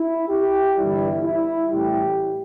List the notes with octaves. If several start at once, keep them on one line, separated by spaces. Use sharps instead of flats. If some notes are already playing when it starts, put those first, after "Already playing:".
Already playing: E4
G4
G1 G2 E3 G3 E4
E4
A1 A2 G3 G4